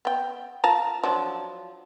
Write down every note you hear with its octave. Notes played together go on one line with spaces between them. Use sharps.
B3 G5
F4 A5 A#5
F3 F#3 D4